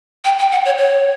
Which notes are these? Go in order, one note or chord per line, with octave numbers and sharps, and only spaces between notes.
G5
G5
F#5
C#5
C#5